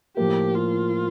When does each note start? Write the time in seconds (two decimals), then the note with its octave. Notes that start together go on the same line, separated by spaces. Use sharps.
0.17 A2 F3 A#3 G4
0.55 F4